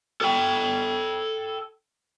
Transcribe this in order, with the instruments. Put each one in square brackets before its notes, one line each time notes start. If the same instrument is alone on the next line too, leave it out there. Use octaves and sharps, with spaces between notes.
[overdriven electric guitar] A4 G5